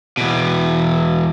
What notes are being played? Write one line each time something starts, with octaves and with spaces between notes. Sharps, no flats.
E2 B2